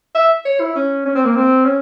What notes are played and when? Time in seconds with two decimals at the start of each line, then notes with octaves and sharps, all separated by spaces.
0.15 E5
0.45 C#5
0.60 E4
0.75 C#4
1.05 C#4
1.15 C4
1.25 A#3
1.36 C4
1.65 C#4